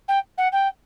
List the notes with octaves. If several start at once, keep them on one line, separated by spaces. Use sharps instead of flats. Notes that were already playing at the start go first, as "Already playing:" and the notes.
G5
F#5
G5